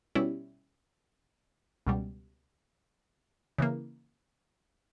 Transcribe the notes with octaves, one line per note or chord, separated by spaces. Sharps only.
B2 G3 C#4 E4
C#2 B2 G3
C#3 E3 A#3